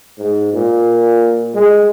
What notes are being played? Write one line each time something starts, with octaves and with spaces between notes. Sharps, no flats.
G#2
A#2
G#3